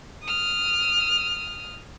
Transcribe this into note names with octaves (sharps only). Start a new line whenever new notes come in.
D#6 F6